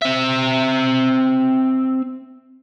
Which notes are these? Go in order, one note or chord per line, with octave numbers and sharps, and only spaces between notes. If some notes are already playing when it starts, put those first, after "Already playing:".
C4 E5